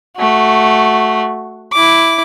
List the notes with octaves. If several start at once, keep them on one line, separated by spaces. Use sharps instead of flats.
A3 F#4
E4 D6